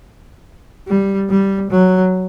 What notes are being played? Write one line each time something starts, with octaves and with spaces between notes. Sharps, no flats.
G3
G3
F#3